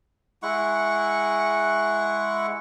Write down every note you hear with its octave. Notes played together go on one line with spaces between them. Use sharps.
G#3 E4 F#5 C#6